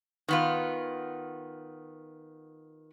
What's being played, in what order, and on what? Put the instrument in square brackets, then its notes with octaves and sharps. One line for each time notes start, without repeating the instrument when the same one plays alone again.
[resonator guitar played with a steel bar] D#3 B3 F4